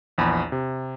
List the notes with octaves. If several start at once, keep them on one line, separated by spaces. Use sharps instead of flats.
A#1 E2 B5
C3